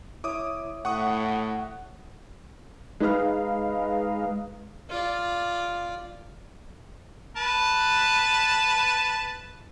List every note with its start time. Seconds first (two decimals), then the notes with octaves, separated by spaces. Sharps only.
0.24 E4 C#5 E5 D6 D#6
0.85 A2 F#5 C#6 D#6
3.00 G#3 D#4 B4 D#5 F5
4.90 F4 D5
7.37 B4 A5